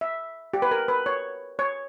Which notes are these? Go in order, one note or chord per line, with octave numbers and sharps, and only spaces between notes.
E5
G4
B4
A#4
B4
C#5
C#5